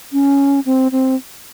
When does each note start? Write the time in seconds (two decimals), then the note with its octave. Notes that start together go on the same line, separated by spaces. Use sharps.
0.13 C#4
0.66 C4
0.92 C4